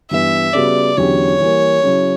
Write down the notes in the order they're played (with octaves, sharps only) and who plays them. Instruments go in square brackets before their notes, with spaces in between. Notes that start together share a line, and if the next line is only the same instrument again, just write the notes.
[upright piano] G2 E3 B3 [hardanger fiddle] E5
[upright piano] C#3 G3 B3 F#4 [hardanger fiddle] D5
[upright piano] E2 D3 F#3 C#4 G4 [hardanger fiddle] C#5
[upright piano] E3 G3 A#3
C#3 F#3 C#4 E4